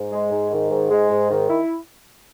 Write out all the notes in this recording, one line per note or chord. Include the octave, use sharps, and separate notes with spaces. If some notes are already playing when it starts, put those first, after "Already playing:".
Already playing: G#2
G#3
G#2
D#3
G#2
G#3
G#2
D#3
E4